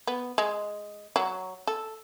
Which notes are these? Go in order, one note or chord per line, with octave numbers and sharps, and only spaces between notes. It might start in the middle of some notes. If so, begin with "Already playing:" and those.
B3
G#3
F#3
A4